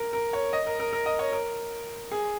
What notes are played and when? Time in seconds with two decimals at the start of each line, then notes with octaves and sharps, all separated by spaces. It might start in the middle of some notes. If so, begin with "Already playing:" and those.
Already playing: A#4
0.13 A#4
0.33 C#5
0.53 D#5
0.66 A#4
0.79 A#4
0.93 A#4
1.06 D#5
1.19 C#5
1.32 A#4
2.11 G#4